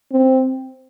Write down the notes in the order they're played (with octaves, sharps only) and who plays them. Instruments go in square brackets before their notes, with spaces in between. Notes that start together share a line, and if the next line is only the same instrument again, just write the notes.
[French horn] C4